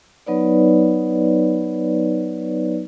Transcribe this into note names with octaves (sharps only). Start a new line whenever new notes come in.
F#3 B3 D#4 B4 C#5 D5